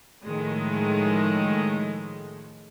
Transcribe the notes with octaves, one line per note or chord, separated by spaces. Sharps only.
A2 D#3 F3 G#3 A3